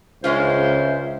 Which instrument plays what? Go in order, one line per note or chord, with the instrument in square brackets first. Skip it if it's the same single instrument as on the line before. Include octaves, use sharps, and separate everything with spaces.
[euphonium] C#2 [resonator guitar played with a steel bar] G#3 C#4 F4 [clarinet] C5 [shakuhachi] E5